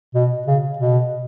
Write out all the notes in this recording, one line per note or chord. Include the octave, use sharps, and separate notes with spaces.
B2
C#3
B2